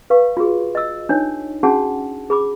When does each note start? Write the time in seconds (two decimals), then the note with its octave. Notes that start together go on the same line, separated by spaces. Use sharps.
0.10 B4 F5 C#6
0.37 F4 F#4 G#4
0.75 D#5 E6
1.09 D4 D#4 C#5
1.63 C#4 D4 F#4 G#4 F#5 A5
2.30 G#4 B5 D6